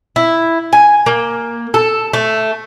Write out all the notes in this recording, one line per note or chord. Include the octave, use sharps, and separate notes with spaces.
E4
G#5
A#3
A4
A3